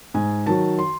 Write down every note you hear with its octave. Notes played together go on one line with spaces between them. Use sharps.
G#2 G#5
D#3 F#3 A5
C6